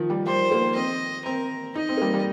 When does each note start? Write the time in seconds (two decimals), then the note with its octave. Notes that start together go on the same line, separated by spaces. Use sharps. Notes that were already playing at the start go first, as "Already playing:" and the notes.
Already playing: D#3 F3
0.10 G3
0.26 G3 C5
0.51 A#3
0.75 C4 D#5
1.25 C4 A#4
1.75 D#4 D#5
1.89 C4
1.97 A#3
2.01 G3
2.14 G3